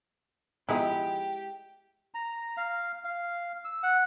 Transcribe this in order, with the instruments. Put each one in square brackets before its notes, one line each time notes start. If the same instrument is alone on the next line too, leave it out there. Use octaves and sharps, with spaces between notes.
[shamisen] F3 B3 D#4 [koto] G#3 E4 [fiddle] G4
[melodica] A#5
F5
F5
E6
F#5